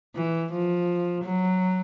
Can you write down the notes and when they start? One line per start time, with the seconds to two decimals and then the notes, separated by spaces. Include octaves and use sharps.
0.15 E3
0.52 F3
1.24 F#3